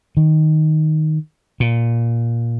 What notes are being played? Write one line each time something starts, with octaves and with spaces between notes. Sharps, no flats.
D#3
A#2